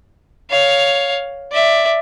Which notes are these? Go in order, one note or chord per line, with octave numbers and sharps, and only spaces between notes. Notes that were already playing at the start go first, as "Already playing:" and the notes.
C#5 F5
D5 E5